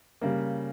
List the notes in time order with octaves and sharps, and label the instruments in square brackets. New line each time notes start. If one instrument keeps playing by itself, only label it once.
[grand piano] C#3 G3 A#3